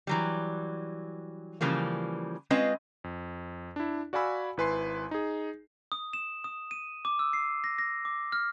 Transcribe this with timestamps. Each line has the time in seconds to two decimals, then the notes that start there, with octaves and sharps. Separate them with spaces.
0.07 E3 F#3 G3
1.61 C#3 E3 F3 G3 A#3
2.50 G#3 C4 C#4 F4 B4 D#5
3.04 F2
3.76 D4 E4
4.13 F#4 D5 F5 G#5 B5 E6
4.57 G#1 E4 B4 G#5 C6 C7
5.11 D#4 G#4
5.92 D#6
6.13 E7
6.44 D#6
6.71 D#7
7.05 D6
7.19 E6
7.33 C7
7.64 A#6
7.78 A#6
8.05 D6
8.32 F6